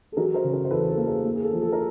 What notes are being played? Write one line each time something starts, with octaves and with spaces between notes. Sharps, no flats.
A4
F#3 G#4 A#4
A#4 C5
C#3
A#4 C5
C5
E2 A4 B4
A4
A#3
G#4 A#4
A#3
G#4
A4
F3
A4
A#4